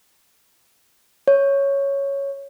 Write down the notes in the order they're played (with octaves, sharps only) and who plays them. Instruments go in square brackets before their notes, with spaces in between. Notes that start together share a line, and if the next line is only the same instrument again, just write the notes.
[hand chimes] C#5